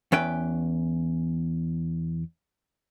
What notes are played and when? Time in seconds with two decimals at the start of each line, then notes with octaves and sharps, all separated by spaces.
0.12 E2 C#4 B4 G5